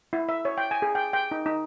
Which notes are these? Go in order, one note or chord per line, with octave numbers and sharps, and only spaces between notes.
E4
E5
C#5
G5
G#5
G#4
G5
G5
D#4
D#4